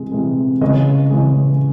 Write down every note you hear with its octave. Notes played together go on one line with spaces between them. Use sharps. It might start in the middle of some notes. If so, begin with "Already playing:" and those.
Already playing: C3 E3 G#3
C3 E3 G#3
C#3 E3 G#3 D#5
C#3 E3 G#3